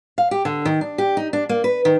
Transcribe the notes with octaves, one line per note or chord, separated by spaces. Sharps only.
F5
G4
D3
D#3
D4
G4
D#4
D4
A#3
B4
D#3